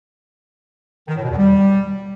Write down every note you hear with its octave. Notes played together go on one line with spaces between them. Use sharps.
D#3
A2
B2
E2
G3